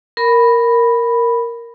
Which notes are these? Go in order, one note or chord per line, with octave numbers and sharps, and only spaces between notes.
A#4 B5